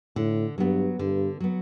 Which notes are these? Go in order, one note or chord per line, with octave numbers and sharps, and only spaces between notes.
A2 D3
G2 F#3 B3
G2 D3
F#3 B3